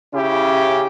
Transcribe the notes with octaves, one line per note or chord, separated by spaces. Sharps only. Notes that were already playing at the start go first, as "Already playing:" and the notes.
C#3 C#4 E4 G4